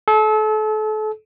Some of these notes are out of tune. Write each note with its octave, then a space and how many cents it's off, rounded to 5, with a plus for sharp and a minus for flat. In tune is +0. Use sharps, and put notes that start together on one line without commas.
A4 -35